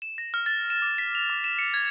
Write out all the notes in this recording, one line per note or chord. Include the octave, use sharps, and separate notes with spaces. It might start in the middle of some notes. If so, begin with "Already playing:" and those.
E7
A#6
F6
A6
E7
D6
B6
F7
D6
E7
C#7
G#6